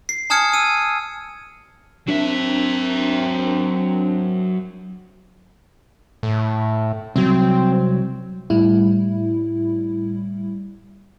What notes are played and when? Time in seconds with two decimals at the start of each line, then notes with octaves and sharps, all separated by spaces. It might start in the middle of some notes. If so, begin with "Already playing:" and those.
0.09 C7
0.30 G#5 A5 D#6 F6 G#6 C#7
0.53 E6 D#7
2.08 F#3 C4 D4 A#4 E5
6.23 A2
7.16 C2 F#3 C4
8.50 A2 G3 E4